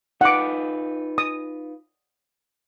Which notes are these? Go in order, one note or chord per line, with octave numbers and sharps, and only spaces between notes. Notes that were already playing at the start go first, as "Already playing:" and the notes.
D#4 F4 B4 F#5 D6
D#6